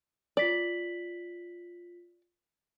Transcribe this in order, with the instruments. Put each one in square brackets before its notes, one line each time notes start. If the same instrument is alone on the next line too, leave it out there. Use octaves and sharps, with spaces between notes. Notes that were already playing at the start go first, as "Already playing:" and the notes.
[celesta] F4 B6 F#7 [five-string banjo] D5